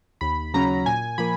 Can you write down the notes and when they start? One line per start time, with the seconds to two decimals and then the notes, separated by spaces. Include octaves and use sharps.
0.21 D#2 B5
0.54 C#3 F#3 C#4 A#5
0.86 A#2 G#5
1.18 F3 A#3 B5